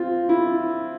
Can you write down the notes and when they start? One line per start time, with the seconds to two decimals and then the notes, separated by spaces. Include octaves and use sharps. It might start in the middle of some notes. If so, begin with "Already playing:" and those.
Already playing: C4 F4
0.29 E4